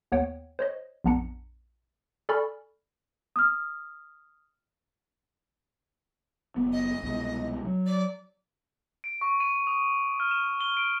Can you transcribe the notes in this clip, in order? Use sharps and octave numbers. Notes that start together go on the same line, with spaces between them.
D#2 B3 C#5 F#5 G5
C5 C#5 D#5
A#1 F2 B3 D4 A#5 C#7
A4 D5 G#5 B5 C#6 F6
D#6 F6
F#1 B3
D#5
C2 B2 G#3
F#3
D5
D7
C#6
D#7
D#6
F6
E7
G7
D7